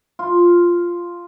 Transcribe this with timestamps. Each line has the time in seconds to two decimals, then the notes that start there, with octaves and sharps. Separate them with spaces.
0.19 F4